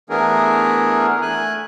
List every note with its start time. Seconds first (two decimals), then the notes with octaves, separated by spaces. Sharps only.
0.10 E3 A3 B3 D4 G#4 A#4
1.22 A3 G#5 F#6